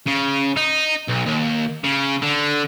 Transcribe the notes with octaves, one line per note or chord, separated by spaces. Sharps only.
C#3
D#4
B1
D#2
C#3
D3